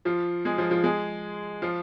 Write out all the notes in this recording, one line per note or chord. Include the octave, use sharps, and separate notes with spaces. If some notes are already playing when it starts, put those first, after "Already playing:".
F3 F4
G#3 G#4
F3 F4
F3 F4
G#3 G#4
F3 F4